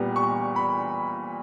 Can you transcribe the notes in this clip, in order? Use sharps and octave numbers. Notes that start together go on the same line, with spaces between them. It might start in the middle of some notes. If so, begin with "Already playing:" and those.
Already playing: A#2 G3 B3
C#6
B5